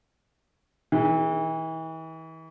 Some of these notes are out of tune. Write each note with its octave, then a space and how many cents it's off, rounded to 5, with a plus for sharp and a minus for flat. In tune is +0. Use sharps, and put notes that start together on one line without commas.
E3 -40 G#4 +0